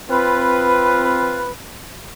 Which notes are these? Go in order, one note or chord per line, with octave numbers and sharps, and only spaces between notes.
C4 F4 B4